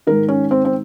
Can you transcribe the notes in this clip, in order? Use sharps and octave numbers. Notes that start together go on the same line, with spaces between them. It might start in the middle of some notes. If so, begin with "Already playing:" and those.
G#2 D#3 A#4
C#4
C4
C4